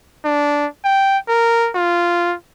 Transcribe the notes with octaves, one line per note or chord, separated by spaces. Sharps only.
D4
G5
A#4
F4